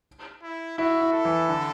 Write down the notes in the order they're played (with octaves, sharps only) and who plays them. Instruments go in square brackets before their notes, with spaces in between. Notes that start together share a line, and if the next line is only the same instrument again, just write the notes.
[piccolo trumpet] E4
[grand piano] E4 [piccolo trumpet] F#4
[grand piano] E4
[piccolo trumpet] A4
[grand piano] E3
D3